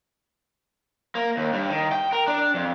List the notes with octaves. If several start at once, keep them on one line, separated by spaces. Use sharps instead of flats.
A#3
D#2
G2
D#3
G5
A#4
D4
F2